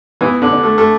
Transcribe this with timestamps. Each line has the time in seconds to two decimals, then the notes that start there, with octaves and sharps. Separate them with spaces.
0.21 E3 B3
0.42 D3
0.52 D4
0.63 A3
0.78 A3